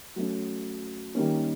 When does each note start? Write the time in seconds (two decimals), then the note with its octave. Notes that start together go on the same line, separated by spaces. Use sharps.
0.16 F#3 A3 C#4
1.15 D#3 G3 A#3 C#4